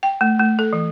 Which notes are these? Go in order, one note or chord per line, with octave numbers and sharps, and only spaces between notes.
G5
A3
A3
A4
E3